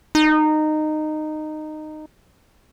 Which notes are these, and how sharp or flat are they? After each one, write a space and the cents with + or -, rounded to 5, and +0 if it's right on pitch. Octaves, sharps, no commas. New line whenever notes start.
D#4 -15